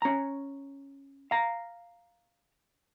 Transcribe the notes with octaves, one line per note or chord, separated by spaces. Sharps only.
C#4 A#5
F5 A#5